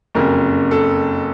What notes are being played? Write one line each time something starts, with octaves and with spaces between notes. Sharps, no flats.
F#1 F2 C#3 A#4
A4